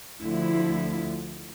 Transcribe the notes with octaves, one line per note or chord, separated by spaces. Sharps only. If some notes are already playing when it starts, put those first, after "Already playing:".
D2 D3 F3 E4